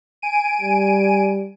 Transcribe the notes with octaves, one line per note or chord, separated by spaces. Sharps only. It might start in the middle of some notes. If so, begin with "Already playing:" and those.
G#5 D7 D#7
G3